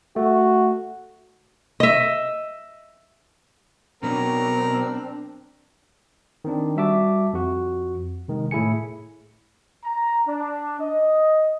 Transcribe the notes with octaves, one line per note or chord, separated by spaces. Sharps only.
A3 F#4
D#5 E5
B2 F#3 C4 D4 A#4
D#3 C4 D4
G3 F#4 E5 A5 D6
F2 F#4
C3 D#3 G#3
A2 A3 E4 G#4 G#5 C#7
A#5
D4
D#5